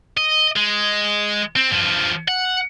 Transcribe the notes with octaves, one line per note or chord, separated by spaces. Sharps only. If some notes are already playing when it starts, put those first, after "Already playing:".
D#5
G#3
C4
G2 F3
F#5